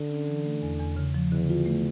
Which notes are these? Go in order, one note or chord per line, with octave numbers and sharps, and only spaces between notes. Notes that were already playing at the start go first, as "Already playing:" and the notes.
Already playing: D3
C#4
E3
A3
E2
E2
C#3
F3
E2 D3
F4
A3